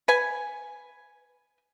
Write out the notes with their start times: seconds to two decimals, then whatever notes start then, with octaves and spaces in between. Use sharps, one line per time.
0.08 B4 G#5